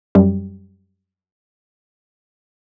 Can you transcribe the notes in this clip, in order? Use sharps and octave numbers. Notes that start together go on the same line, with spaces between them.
F#2 G3